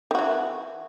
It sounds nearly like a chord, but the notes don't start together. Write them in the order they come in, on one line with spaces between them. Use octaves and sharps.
D#3 F#4 E3